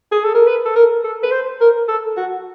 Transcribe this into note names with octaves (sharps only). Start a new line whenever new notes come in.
G#4
A4
A#4
B4
A4
A#4
A4
B4
C5
A#4
A4
F#4